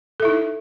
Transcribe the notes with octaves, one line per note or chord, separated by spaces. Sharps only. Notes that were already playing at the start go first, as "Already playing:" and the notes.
D#4 E4 A4 E5